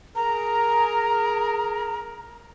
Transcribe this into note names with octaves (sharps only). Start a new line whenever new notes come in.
G#4 A#4 A#5